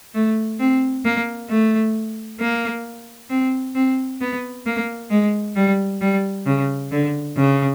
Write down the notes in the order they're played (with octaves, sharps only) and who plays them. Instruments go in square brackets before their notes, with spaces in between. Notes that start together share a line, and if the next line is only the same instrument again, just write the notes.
[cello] A3
C4
A#3
A3
A#3
C4
C4
B3
A#3
G#3
G3
G3
C#3
D3
C#3